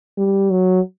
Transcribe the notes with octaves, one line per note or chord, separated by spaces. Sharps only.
G3
F#3